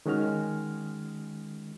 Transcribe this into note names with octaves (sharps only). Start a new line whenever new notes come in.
D#3 G#3 C#4 F#4 F6